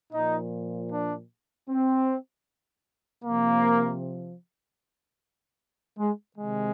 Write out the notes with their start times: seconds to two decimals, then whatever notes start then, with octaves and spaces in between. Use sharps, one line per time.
0.13 A#2 F3 D#4
0.90 D4
1.69 C4
3.24 C3 F3 A#3
5.98 G#3
6.36 C3 D#3 G#3